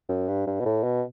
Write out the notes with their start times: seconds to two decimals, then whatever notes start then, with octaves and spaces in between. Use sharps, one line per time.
0.09 F#2
0.28 G2
0.47 G2
0.60 B2
0.65 A2
0.83 B2